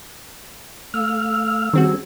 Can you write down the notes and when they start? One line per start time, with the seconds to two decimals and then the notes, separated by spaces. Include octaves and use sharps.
0.94 A3 F5 E6 F6
1.73 D#3 G3 C4 C#4 F#4 G#4